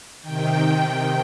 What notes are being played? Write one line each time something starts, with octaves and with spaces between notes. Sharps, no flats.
C3 D#3 G5